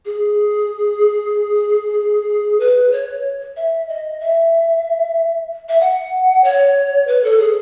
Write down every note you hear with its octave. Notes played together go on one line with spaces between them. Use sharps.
G#4
B4
C#5
E5
D#5
E5
E5
F#5
C#5
B4
A4
G#4